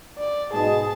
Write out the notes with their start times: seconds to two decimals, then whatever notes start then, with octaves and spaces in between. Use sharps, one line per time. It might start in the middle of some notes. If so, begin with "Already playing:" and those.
0.18 D5
0.53 G#2 B2 G#4 A5